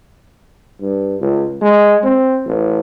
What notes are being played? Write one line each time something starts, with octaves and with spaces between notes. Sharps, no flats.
G2
C#2
G#3
C4
A1